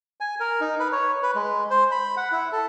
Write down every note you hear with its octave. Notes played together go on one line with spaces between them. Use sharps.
G#5
A#4
D#4
B4
C#5
B4
G#3
C5
B5
F#5
E4
A4